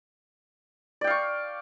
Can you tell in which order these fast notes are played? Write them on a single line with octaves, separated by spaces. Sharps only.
D5 G5 F5 C#6